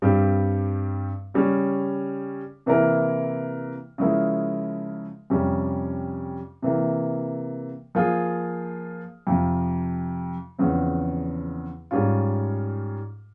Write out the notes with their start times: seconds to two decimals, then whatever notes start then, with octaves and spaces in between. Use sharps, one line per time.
0.02 G2 G3 C4 G4
1.34 C#3 G3 C#4
2.66 C3 E3 A#3 E4 A#4
3.98 C#3 F3 G#3 E4 A#4
5.30 F2 C3 G3 C#4
6.62 C3 E3 A#3
7.95 F3 A#3 F4 G#4
9.27 F2 C3 F3
10.58 E2 C#3 F3 C4
11.91 G#2 G3 C#4 F4